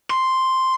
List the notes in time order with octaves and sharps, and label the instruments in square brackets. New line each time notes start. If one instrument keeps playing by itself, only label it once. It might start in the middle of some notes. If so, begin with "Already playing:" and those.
[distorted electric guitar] C6